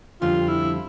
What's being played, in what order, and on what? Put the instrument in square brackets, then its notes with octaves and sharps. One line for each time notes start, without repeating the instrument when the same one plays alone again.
[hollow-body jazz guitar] F2 D3 G3 [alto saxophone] F4
[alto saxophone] E4